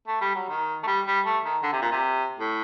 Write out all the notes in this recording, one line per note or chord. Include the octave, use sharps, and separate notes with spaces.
A3
G3
F#3
D#3
A3
G3
G3
A3
D#3
D3
C3
A#2
C3
A2